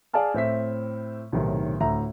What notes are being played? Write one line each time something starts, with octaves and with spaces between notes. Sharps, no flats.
G#4 D5 F5 G#5 A5 F6
A2 C4 E5 B6
B1 A2 C3 D#3
D2 A2 E5 A#5